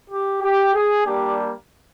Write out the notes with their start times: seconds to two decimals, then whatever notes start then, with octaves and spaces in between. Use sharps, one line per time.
0.10 G4
0.42 G4
0.74 G#4
1.06 G3 A#3 D4 G4